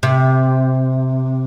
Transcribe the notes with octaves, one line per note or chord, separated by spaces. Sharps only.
C3